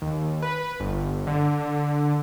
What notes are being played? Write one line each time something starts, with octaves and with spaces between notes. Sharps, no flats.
D#2
B4
G1
D3